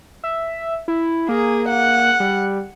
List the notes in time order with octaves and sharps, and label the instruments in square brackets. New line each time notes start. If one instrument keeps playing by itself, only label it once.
[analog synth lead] E5
E4
[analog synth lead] A#3 [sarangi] G#4
[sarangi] F#5
[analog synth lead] G3